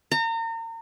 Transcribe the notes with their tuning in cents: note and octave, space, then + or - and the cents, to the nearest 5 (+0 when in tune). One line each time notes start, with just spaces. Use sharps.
A#5 -35